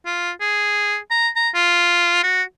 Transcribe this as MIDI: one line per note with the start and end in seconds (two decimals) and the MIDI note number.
0.06 0.31 65
0.41 0.97 68
1.11 1.29 82
1.36 1.49 82
1.55 2.19 65
2.23 2.43 66